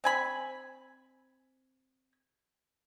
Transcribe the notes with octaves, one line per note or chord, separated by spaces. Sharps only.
C4 G#5 B5